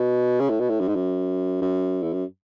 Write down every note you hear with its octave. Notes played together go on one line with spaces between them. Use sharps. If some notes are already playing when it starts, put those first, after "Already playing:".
Already playing: B2
C#3
A2
B2
A2
F#2
G#2
F#2
F#2
E2
F#2